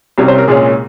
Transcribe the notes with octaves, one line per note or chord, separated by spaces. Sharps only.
C2 C3 G3 C#4 C#5
C5
A#4
C2 A#2 G#3 C#4 G#4